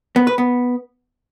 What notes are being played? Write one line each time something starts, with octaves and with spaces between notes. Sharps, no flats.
B3
B4
B3